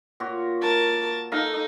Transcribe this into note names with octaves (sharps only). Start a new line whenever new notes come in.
A#2 F#4 C#5
A#4 A5
D#4 A4 F5 A#5